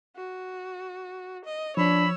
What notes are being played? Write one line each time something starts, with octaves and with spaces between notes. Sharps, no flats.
F#4
D#5
F3 D4 C#5 B5 E6